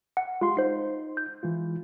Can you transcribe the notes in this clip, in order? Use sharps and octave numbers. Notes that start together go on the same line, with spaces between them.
F#5
G#3 F4 G4 F5 C6
D#4 C5 C7
G6
E3 G#3 F4